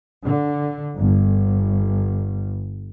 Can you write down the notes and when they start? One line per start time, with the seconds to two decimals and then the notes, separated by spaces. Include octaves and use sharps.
0.24 D3
0.97 G1